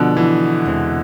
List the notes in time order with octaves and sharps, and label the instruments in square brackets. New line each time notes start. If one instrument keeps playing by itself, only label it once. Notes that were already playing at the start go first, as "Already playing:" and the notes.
Already playing: [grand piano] B2 D3 [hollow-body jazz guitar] F3 B3 F4 B4
[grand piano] E3
[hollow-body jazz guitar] E2 C3 G#3 C4